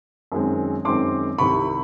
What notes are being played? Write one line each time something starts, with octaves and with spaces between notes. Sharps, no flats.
F#2 D#3 G#3 C4
F#2 D#3 G#3 C4 C6 D6
C2 C3 D#3 B5 C#6